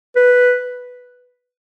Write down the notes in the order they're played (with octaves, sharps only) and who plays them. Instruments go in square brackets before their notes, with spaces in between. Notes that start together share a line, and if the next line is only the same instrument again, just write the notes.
[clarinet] B4